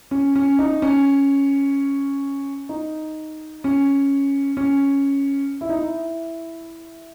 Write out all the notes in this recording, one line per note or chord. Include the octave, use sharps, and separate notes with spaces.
C#4
C#4
D#4
C#4
D#4
C#4
C#4
E4
D#4
E4